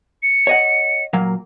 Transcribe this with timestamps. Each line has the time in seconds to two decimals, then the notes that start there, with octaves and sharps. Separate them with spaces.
0.23 C#7
0.47 C#5 D#5 F#5
1.13 A#2 F#3 A#3